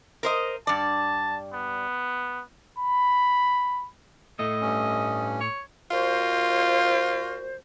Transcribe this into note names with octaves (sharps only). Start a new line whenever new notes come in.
A#4 C5 D#5
G2 D5 A5
B3
B5
A2 A3 D#5
G2 C#4
C#5
A#2 F4 F#4 C5